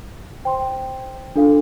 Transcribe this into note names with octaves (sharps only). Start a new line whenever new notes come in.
C5 G5 C6
D4 F4 A4 F5